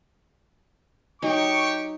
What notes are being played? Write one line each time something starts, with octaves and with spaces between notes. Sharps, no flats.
F#3 D#4 G4 G5 C#6